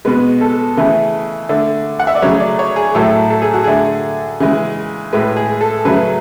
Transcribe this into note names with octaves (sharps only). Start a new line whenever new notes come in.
B2 G#3 B4
A4
C#3 E3 A3
D3 A3
F#5
E5
D5
C#3 F#3 A3 C#5
D5
C#5
G#4
A2 F#3 A3 A4
A4
G#4
F#4
D3 A3 G#4
C#3 E3 G#3
A2 G#3 B4
G#4
A4
C#3 F#3 A3 B4